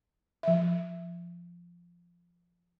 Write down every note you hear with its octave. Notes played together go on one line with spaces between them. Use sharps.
F3 E5